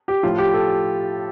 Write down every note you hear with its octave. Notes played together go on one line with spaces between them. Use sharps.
G4
A2 F3 F4
G4
A4